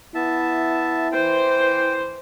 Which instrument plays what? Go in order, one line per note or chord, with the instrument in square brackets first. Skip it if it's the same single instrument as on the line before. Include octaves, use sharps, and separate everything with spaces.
[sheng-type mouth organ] B3 E5 A5 [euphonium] E4
[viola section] E3 C5 [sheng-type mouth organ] G5